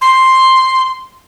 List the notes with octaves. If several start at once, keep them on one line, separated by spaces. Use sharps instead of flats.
C6